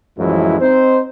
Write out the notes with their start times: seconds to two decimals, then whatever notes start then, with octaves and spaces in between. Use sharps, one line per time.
0.19 A1 F#2 E3 F3 G#3 E4
0.61 C4 D#4 C5